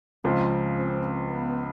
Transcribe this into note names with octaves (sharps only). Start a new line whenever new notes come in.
C#2 C#3 F3 C4
C4
B3